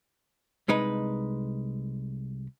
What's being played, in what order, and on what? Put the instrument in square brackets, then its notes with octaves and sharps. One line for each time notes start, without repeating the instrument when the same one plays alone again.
[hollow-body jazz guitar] C2 G#3 D#4 B4